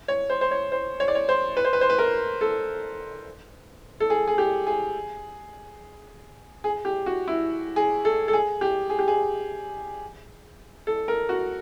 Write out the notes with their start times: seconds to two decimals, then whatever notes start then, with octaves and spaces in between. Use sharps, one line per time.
0.08 C#5
0.30 C5
0.41 C5
0.51 C#5
0.72 C5
1.00 C#5
1.08 D5
1.15 C#5
1.29 C5
1.57 B4
1.65 C5
1.73 B4
1.81 C5
1.90 B4
1.98 A#4
2.41 A4
4.00 A4
4.10 G#4
4.28 G#4
4.38 G4
4.67 G#4
6.64 G#4
6.85 G4
7.06 F#4
7.28 E4
7.76 G#4
8.05 A4
8.28 A4
8.33 G#4
8.61 G4
8.90 G#4
8.99 G4
9.08 G#4
10.87 A4
11.08 A#4
11.29 F#4